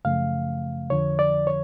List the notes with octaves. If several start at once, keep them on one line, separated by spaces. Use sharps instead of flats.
F#2 C#3 F3 A3 F5
F2 D3 F3 C#5
D5
C#5